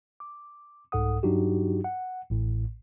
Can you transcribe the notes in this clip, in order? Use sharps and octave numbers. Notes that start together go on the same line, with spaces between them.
D6
C2 G#2 A4 F#5 D#6
G2 F#3 D4 D#4 F#4 G4
F#5
A1 A2